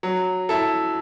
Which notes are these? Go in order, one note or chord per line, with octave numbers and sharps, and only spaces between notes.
F#3
E4 A4